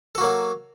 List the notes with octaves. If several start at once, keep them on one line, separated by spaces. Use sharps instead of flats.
F#3 A#3 F#4 A4